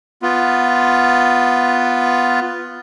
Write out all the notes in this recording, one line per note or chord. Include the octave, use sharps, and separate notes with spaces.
B3 F4